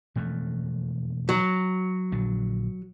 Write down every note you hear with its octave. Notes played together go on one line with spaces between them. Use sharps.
E1 F2 A3
F#3
A#1 D3